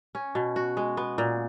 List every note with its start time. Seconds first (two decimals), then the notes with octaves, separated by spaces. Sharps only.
0.15 C#4
0.35 B2
0.56 F#4
0.77 G#3
0.97 B3
1.18 A#2